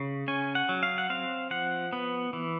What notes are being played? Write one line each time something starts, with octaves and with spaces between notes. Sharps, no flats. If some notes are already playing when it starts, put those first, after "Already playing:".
Already playing: C#3
C#4 G#5
F#5
F#3
F5
F#5
C4 F5
F3 F#5
B3
E3